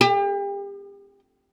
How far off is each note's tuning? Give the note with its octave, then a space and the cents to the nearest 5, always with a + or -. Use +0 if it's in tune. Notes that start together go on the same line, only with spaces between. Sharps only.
G4 +35